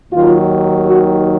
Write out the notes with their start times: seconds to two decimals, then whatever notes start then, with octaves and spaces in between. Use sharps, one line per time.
0.11 D#2 D#3 F#3 F4
0.85 F#4